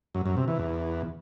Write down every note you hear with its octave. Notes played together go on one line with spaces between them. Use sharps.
F#2
F#2
C3
E3
E2